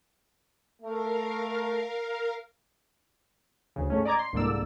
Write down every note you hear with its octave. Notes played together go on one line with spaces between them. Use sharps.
A3 A#4 F5
D2 C#3
G#2 A3 C#4
D5 D#5 A#5 D6 G#6
C6
C2 G#2 D3 A#3 D5 E6